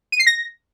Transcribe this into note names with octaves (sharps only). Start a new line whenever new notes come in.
D#7
C7
A#6